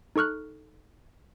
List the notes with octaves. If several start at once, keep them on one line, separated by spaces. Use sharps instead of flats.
D#4 A4 C#6 F6 F#6